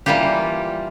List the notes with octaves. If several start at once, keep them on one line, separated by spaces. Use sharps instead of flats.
E3 G3 A#3 F4 G4